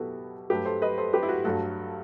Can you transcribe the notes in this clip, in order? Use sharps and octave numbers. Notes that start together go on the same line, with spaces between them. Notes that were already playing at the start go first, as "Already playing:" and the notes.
Already playing: B2 F#3 E4 F#4 G4 A4 B4
G2 F#3 A3 G4 B4
A4 C5
B4 D#5
A4 C5
G4 B4
E4
F#4
G2 F#3 A3 F#4 A4